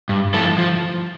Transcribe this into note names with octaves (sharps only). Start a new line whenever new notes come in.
G2
F3 A3 E4 A4
F3